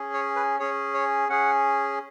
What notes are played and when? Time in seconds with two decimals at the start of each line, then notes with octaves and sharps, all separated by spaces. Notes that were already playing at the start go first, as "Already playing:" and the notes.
Already playing: C#4 G#4
0.14 C#5
0.36 B4
0.59 C#4 G#4 C#5
0.94 C#5
1.29 C#4 G#4 F#5